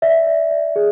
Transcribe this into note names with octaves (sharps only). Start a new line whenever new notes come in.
D5 E5
D5
D5
G#4